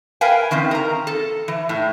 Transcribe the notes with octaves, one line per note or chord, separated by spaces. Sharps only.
A#4 B4 F5 G5 G#5
D#3 E3 C4 C#4
A#4 A#5
A4
E3
A2